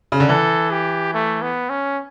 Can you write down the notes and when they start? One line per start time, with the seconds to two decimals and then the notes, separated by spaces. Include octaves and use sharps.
0.12 C#3
0.20 D3
0.29 E3 A4
0.71 G4
1.14 A3
1.42 B3
1.70 C#4